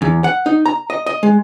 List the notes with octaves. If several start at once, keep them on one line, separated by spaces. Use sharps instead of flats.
E2
F#5
D#4
A#5
D#5
D#5
G#3